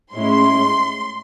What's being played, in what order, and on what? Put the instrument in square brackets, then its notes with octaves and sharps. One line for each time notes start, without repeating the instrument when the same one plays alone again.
[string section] A2 G#3 C#4 E4 C6